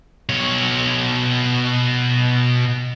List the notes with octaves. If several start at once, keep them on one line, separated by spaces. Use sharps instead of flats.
B2 C#5